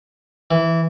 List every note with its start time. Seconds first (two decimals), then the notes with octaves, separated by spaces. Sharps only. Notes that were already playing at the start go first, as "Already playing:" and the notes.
0.51 E3